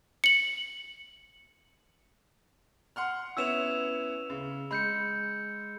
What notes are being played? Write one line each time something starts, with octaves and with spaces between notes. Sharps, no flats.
C#7 F#7
F#5 C6 F6
B3 C#4 E4 E6 E7 F7
C#3
G#3 B5 G6 C#7